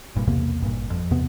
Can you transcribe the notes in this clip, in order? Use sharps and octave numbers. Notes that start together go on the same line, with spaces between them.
F#1 G2 A#2
B1 E2 C3 A#3
G#1 G2 A#2
F2
E2 C3 B3